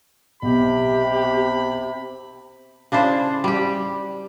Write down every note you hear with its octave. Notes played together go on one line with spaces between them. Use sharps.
B1 C3 G4 B5
C#3 D4 E4 C5
G3 G4